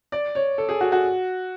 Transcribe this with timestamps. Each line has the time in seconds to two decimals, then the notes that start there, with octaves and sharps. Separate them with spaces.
0.12 D5
0.35 C#5
0.58 A4
0.69 G#4
0.81 F#4
0.92 F#4